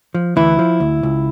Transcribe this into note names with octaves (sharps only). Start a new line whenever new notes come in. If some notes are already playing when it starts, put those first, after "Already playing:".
F3
D2 E3 E4
F3
D2
C#2